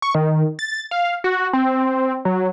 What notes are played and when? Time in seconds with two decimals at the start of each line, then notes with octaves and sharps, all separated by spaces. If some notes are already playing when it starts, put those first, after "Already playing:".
0.02 C#6
0.15 D#3
0.59 A6
0.91 F5
1.24 F#4
1.53 C4
2.25 F#3